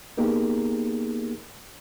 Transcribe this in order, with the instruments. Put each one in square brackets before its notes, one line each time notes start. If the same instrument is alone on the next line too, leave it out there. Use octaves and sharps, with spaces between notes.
[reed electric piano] A#3 B3 D#4 G4 G#4 A#4